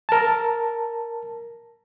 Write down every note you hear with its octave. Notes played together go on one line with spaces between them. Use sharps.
A#4 A5